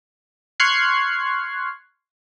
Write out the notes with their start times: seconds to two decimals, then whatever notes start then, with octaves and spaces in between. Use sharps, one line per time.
0.60 C6 C#6 F6 F#6 G#6 C7